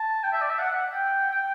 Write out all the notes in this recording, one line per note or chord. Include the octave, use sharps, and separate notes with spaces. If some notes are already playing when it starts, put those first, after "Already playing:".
Already playing: A5
G5
E5
D5
E5
F#5
F#5
G5
G5